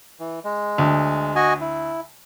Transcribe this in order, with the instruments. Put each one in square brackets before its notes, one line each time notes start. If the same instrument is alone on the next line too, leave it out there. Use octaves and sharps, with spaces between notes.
[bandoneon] E3
G#3
[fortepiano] D2
[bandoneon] F#4 D#5 G#5
E4